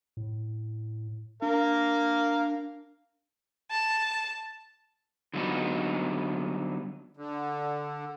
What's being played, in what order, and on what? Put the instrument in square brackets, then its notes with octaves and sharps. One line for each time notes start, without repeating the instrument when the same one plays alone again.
[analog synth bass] A2
[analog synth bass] D4 [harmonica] A#4 F5
[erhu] A5
[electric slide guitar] D3 F#3 G3 A3 B3 D#4
[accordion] D3